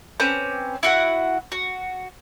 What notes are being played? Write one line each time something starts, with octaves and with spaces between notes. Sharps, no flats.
C4 C#4 B4 D6
E4 F#4 F#5
F#4